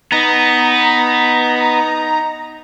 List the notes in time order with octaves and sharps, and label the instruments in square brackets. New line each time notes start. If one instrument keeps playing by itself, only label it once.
[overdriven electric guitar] B3 [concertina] D#4 [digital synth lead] A#5